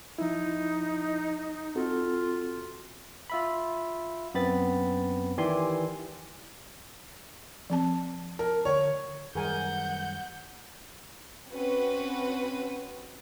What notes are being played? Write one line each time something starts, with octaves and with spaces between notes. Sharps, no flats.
F3 D#4 E4
C4 F4 F#4 A4
F4 E5 B5
F#2 B3 C4 B5 A6
D#3 E3 G4 D5 G#5 C6
F3 C4 A5
A#4 A5
D3 C#5
F#2 D#3 G3 G#4 A#4 F#5 G#5 G6
C4 C#4 F#4 B4